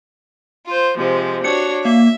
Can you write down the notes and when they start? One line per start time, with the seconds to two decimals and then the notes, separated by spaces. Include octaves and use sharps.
0.67 F4 C5
0.97 C3 F3 G#3
1.44 D4 F#4 C#5 C#7
1.85 A#3 E5